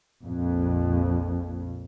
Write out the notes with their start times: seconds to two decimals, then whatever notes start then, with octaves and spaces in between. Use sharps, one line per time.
0.25 A#1 F2